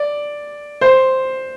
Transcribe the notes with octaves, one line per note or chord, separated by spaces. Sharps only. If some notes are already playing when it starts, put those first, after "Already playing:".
Already playing: D5
C5